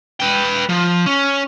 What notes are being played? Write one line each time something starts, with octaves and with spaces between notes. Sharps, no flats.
B4 G5
F3
C#4